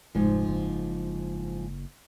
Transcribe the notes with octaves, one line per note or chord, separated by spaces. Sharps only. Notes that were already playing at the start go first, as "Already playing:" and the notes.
F1 G#2 F3
F#1